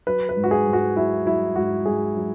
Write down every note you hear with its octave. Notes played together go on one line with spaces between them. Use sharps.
F#3 B4
B4
G#2
F#4
G#4
G#2
F#4
F#3 E4
F#3 E4
G#2 F#4
G#2 G#4
F#3